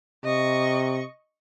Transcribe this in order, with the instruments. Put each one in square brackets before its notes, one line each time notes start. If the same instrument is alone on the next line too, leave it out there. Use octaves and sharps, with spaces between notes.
[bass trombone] C3 [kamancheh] D#5 C#6